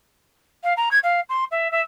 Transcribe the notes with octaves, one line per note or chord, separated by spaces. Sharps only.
F5
A#5
G#6
F5
C6
E5
E5